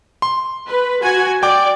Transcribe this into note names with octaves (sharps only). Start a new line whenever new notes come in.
C6
B4
F#4 G#5
D5 G5 D6